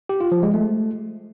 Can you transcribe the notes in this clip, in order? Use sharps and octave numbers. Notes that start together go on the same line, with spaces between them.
G4
F4
F3
G#3
A3